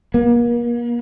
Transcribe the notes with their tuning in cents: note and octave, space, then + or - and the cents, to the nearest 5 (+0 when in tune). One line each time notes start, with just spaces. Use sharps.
A#3 +40